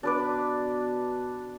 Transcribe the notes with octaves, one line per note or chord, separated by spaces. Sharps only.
B2 D4 B4 D6